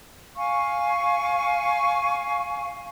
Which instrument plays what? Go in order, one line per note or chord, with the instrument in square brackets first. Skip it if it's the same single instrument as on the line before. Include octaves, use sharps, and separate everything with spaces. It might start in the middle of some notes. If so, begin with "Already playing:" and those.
[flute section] F5 G#5 C#6